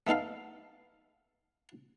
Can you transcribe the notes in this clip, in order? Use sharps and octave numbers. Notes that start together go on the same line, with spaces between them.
A3 B3 D#4 A4 F5